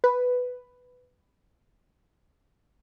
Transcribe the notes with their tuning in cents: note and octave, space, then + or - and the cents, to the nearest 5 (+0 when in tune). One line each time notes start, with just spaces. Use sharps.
B4 +5